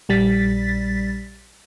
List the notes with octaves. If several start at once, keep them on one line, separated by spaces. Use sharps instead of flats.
A#1 G3 A6 B6